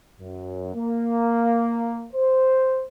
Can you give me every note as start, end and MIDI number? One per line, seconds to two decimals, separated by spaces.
0.20 0.70 42
0.74 2.06 58
2.13 2.84 72